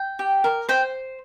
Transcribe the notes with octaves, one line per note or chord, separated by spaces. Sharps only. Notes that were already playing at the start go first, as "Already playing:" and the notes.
Already playing: G5
G4
A#4
C5 G5